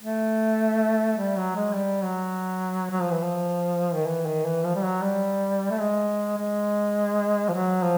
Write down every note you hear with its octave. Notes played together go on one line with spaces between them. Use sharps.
A3
G3
F#3
G#3
G3
F#3
F#3
F3
E3
F3
D#3
E3
D#3
E3
F3
G3
F#3
G3
A3
G#3
G#3
F3
F#3
F3